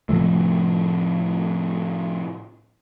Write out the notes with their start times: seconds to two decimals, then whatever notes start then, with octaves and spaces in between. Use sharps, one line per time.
0.09 A2 C3 F3 A3